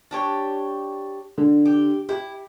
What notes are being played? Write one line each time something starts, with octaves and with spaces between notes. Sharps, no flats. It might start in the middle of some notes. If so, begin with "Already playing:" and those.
D4 G4 C#5
D3
G4
E4 G4